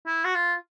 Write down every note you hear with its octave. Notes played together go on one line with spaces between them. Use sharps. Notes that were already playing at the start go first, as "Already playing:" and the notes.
E4
F#4
F4